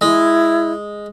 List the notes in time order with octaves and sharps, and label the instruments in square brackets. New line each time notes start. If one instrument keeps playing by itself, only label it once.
[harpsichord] G#3 [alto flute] E4